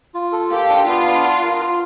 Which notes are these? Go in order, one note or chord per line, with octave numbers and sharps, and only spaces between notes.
F4
A4
A#3 G4
D4
B3 F4
D4
F#5
A#4
F4